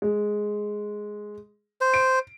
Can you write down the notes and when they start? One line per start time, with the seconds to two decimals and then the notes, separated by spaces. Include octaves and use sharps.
0.02 G#3
1.81 C5
1.94 D7